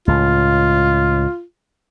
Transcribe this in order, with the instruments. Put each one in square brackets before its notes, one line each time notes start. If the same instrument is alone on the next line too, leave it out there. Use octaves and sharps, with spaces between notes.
[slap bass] C#2 A2 [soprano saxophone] F4